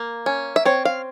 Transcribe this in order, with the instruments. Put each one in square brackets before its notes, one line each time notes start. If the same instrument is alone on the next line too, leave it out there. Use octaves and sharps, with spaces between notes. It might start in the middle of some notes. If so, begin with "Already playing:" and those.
Already playing: [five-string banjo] A#3
C#4
E5
C4 C#5
F5